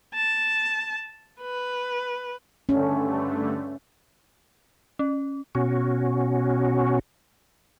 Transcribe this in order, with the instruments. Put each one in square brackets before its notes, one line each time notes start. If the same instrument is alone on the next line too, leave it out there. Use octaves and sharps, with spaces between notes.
[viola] A5
B4
[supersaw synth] G2 D3 A3 [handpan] C#4
[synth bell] C#4
[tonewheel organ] B2 C#4 F#4